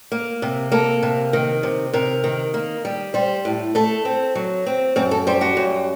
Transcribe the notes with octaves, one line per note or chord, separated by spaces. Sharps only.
A#3
C3
A#3 A4
C3
D#3
C3
C3 A#4
D#3
A#3
G3
G3 C5
A2
A3 A4
C4
F#3
C4
F#2 C4
A4
G3 C5
F#4
F#2